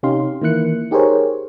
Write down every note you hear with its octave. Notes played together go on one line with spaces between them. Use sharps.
C3 C#4 D#4 G4 F5 C6
D#3 E3 A#3 E4 F#6 C#7
D#4 G4 G#4 A#4 C5 C#5